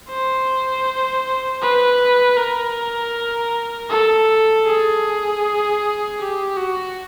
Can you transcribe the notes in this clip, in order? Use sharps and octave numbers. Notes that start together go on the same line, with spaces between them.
C5
B4
A#4
A4
G#4
G4
F#4